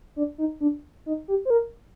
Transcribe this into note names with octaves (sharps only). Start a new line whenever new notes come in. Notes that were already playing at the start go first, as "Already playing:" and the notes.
D4
D#4
D4
D#4
G4
C5
A#4